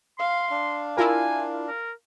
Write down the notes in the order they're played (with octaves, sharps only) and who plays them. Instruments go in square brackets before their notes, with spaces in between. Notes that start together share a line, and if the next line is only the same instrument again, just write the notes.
[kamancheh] F5 [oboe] C6
[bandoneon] D4 [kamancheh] F5
[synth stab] E4 F4 A#4 [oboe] G#5
[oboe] A#4